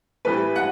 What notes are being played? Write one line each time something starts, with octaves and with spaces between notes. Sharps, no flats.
A2 E3 G3 B4
F#5